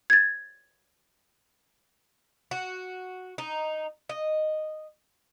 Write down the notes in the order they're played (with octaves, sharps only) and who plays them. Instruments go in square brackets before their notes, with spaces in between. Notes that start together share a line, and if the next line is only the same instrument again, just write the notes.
[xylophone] G#6 A6
[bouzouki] F#4
D#4
D#5